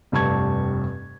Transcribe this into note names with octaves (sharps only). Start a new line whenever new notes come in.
F1 G2 G4 A5 C#6 G#6